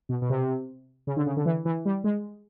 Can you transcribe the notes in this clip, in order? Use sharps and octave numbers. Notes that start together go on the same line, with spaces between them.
B2
B2
C3
C#3
D3
C#3
D3
E3
E3
G3
G#3